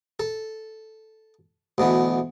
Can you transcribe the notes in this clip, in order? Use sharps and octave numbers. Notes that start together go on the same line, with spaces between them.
A4
D2 B2 E3